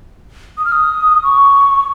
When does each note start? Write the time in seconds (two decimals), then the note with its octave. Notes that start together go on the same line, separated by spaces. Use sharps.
0.58 D#6
0.65 F6
0.72 D#6
1.23 C#6